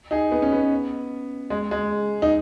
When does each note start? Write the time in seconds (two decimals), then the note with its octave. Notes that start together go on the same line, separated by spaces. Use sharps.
0.11 D#4 G#4
0.32 B3
0.42 C#4
0.52 B3
1.50 G#3
1.71 G#3
2.22 D#4